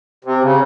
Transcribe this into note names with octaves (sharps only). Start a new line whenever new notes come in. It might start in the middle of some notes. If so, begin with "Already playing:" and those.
C3
C#3